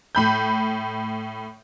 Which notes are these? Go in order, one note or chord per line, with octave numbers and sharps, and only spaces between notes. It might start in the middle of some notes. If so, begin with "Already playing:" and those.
A2 B5 G6